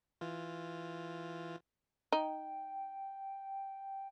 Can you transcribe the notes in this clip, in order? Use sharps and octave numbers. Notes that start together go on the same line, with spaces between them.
E3 F4
D#4 G5